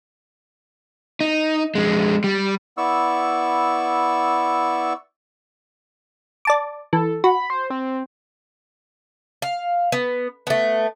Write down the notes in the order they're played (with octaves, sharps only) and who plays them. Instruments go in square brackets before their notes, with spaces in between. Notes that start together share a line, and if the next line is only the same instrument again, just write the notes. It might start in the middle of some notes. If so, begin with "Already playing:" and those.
[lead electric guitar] D#4
F2 G#3
G3
[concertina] B3 E4 D5 C#6 E6
[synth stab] D5 A5 D6
[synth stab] E3 [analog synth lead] A4
[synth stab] F#4 [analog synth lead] B5
[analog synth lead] C5
C4
[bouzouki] F5
B3
A3 B3